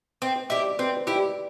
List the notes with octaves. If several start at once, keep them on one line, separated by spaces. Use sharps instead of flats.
C4
C5
E4 G4 D5
D5
C4 B4
C5
E4 G4
D5